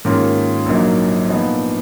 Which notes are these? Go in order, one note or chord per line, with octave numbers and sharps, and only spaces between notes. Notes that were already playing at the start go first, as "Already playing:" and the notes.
G#2 D#3 A#3 C#4 F4
A#1 A#2 F#3 A#3 D#4
A#2 F3 B3 D#4